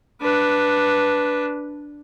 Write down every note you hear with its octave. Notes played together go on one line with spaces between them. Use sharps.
D4 B4